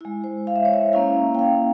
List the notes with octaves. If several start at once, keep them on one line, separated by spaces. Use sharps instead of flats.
G#3 E4
C5
F5
E5
C#5
E5
A#3 C#4 E4 F5
G5
F5